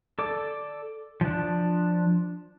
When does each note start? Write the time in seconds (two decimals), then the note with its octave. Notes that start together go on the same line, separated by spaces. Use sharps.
0.19 A4 D5 D6
1.21 F3 D4